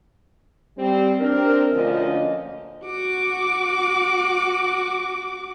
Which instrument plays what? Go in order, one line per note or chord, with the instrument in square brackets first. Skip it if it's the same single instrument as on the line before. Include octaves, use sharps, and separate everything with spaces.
[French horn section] G3 C4
C4 D4 A#4
D2 A#2 D3 F3 C#4 D#5
[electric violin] F#4 D6